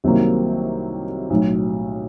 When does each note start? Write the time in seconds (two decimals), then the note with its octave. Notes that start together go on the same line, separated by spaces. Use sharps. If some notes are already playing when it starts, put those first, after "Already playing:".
0.04 C2 C3 D#3 F#3 A#3
1.30 B1 A2 F#3